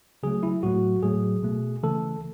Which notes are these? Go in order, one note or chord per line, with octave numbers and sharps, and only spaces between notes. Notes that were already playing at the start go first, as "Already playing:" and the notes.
C#3 F#3 A3 G#4
E4
A2 F#3 A3 F#4
A2 F#3 A3 G#4
B2 A3
C#3 E3 A3 A4